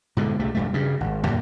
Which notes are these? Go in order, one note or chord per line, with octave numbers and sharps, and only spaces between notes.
G#2 B2 D3
C2 C3 A3
E1 G2 A3
G2 C#3
G#1
F#2 A#2 D#3 G3